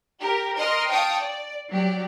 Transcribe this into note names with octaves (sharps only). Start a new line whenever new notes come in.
G4 A#4
A#4 D#5 C6 F6
F5 G5 A5 C#6 D#6
D5
F#3 G4 D5